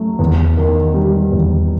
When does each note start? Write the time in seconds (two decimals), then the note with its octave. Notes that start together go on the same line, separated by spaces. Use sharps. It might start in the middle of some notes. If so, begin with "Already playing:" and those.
Already playing: F#3 A3
0.19 E2
0.57 D#3
0.94 G3
1.32 E2